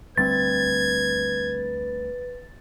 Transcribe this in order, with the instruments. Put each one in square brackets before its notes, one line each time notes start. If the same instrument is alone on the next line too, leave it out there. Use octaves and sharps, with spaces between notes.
[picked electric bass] D2 G3 C4 [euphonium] B4 [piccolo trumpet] G#6 [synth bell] A6